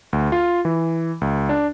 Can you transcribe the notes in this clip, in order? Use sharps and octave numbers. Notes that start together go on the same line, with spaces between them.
D2
F4
E3
C#2
D4